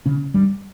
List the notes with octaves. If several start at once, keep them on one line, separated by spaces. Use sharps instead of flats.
C#3 C#4
G2 G3